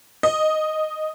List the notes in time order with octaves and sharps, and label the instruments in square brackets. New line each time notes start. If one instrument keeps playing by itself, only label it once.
[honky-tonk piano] D#5